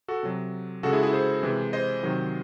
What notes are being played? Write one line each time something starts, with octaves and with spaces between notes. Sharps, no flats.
F#4 A4
C3 F#3
C#3 G#3 F#4 A4
E4 G#4
E4 G#4
G#4 C5
C3 E3 G#3
C5 D#5
C3 D#3 F#3